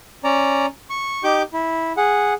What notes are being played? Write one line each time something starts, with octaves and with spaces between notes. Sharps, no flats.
C#4 D5 A#5
C#6
D#4 G4 D6 G6
E4
G#4 F#5